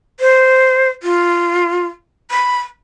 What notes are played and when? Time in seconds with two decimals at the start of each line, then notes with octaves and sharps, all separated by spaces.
0.20 C5
1.03 F4
2.31 B5